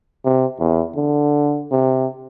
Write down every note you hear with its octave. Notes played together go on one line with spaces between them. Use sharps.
C3
E2
D3
C3